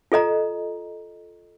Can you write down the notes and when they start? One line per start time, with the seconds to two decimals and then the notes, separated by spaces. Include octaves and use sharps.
0.12 F4 A4 D#5 A#5